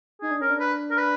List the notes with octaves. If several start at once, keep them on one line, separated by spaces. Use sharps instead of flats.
D#4 G#4
D4
C#4 A#4
D4
B4
A#4
B4